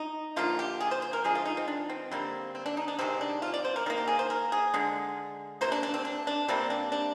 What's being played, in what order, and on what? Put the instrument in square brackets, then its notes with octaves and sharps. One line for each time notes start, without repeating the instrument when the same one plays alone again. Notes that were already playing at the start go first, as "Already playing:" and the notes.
Already playing: [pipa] D#4
D3 F3 A#3 F4
G4
G#4
C5
C5
A#4
D3 F3 G#3 G#4
F4
D#4
C4
D4
C4
D3 G3 A#3 C4
C4
D4
D#4
D4
C3 D#3 G#3 C4
D4
F4
D5
C5
A#4
D#3 A#3 A#4
G4
G#4
C5
A#4
G#4
D3 G#3
C3 G3 A#3 C5
D4
D4
C4
D4
D4
C3 G3 A#3 C4
D4
D4